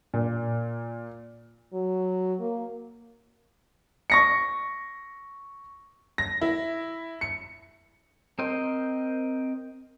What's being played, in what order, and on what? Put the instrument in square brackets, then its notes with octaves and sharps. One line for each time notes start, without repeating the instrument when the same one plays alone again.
[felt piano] A#2
[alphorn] F#3
A#3
[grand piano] C#6 A#6 C#7
[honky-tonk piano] A#6
E4
C#7
[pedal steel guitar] C4 A#4 C5 D#5 G5